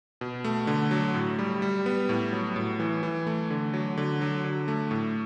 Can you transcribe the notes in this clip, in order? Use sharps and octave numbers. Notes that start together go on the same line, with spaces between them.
B2
A3
D3
F#3
A2
G3
G3
B3
A2
F#3
A2
E3
E3
A3
D3
F#3
D3
F#3
D3
A3
A2